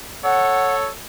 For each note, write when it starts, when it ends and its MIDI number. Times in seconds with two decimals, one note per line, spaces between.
0.24 0.90 69
0.24 0.90 73
0.24 0.75 78